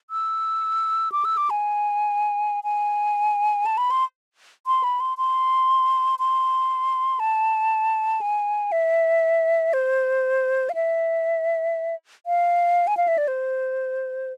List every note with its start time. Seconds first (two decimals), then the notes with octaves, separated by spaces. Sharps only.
0.10 E6
1.12 D6
1.25 E6
1.37 D6
1.50 G#5
2.64 G#5
3.66 A5
3.78 B5
3.91 C6
4.67 C6
4.84 B5
5.00 C6
5.18 C6
6.19 C6
7.20 A5
8.21 G#5
8.72 E5
9.73 C5
10.69 F5
10.75 E5
12.26 F5
12.87 G#5
12.97 F5
13.08 E5
13.18 D5
13.28 C5